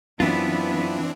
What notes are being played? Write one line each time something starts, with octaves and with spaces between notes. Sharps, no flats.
F#2 E3 B3 C4 D4 E4 F4